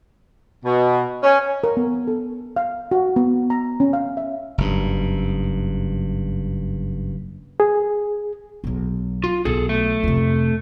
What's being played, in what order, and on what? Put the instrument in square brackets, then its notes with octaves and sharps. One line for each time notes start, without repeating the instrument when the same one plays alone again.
[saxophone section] B2
C#4
[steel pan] A#4
B3
A4
F5
F#4
B3
A#5
C#4
F5
E5
[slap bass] F#1 G2
[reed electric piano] G#4
[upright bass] B1 F#3
[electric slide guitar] F4
[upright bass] B1 [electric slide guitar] G#4 A4
[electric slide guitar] A3
[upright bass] F2 C3